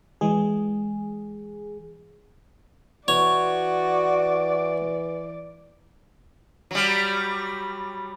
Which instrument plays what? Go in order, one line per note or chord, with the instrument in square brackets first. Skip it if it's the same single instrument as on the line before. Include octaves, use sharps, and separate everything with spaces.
[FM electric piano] E3 G#3 G#4
[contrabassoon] E3 [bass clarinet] F#4 [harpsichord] C#5 [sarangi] D5
[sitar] F#3 G3